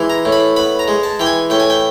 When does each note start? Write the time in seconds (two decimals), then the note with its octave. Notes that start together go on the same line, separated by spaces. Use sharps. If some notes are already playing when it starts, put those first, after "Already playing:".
Already playing: E3 G#3
0.10 A#5
0.25 A2
0.32 B5
0.56 B3 B5
0.79 A#5
0.88 G#3
1.03 A5
1.20 E3 G5
1.26 G#5
1.50 A2 G5
1.60 G#5
1.70 G5